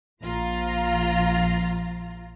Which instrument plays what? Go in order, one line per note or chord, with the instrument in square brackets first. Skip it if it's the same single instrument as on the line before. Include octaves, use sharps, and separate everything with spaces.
[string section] A#1 F3 F4 A#5